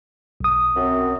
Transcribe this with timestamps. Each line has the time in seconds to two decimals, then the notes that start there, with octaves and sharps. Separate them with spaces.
0.41 B1 D#6
0.76 F#2 C4